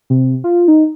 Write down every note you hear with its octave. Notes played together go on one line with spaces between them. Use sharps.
C3
F4
D#4